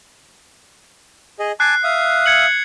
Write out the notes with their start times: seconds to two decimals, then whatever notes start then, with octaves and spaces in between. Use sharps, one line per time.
1.40 G#4 D#5
1.60 G#5 A5 D6 F#6 C7
1.84 E5 F5 D#6
2.26 G#6 C#7 F#7